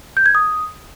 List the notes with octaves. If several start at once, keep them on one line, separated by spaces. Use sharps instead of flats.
G6
G#6
D#6